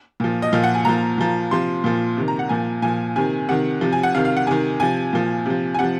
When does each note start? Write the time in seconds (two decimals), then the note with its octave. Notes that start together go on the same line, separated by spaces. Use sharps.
0.20 A#2 F3
0.42 D#5
0.53 A#2 F3 F5
0.64 F#5
0.74 G#5
0.85 A#2 F3 A#5
1.18 A#2 F3
1.51 C3 F3 C6
1.84 A#2 F3
2.17 C3 D#3
2.28 A#5
2.39 F#5
2.49 A#2 F3 G#5
2.82 A#2 F3 G#5
3.16 C3 D#3 G#5
3.48 C3 D#3 F#5
3.81 C3 F3
3.93 G#5
4.03 F#5
4.15 C3 D#3 F5
4.25 F5
4.37 F#5
4.47 C3 D#3 G#5
4.80 C3 F3 G#5
5.13 A#2 F3
5.46 C3 F3
5.74 G#5
5.79 C3 F3 F#5